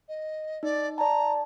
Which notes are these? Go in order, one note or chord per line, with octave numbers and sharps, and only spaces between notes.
D#5
D#4 D5
D5 A5 A#5